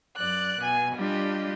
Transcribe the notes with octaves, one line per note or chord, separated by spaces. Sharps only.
F#2 D5 F#6
B2 G#5
G3 D4 F4 G4 D#5